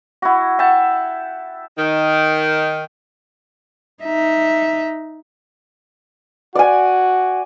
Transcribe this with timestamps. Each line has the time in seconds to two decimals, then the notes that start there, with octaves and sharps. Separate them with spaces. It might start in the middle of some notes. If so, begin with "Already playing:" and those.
0.22 E4 F#4
0.59 E5 F#5 G5 A5
1.78 D#3
4.04 D#4 E5
6.55 F#4 D5 G#5